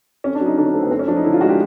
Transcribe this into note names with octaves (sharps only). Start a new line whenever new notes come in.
F2 C#4
D4
F#3
D#4
D3 D4
C#4
A3 C4
B3
F#2 C4
C#4
F3 D4
D#4
D3 E4
F4
G#3 F#4
G4